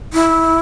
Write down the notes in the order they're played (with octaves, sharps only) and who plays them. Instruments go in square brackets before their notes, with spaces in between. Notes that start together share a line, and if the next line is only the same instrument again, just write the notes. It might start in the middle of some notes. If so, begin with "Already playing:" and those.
[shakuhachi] E4